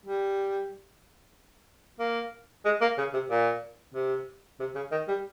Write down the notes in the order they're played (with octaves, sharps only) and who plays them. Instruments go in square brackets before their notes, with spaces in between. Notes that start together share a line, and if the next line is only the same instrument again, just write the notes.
[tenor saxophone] G3
A#3
G#3
A#3
C#3
C3
A#2
C3
C3
C#3
D#3
G3